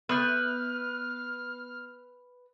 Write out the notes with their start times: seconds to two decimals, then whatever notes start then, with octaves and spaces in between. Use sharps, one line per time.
0.09 B3 B4 D#6 F6 G6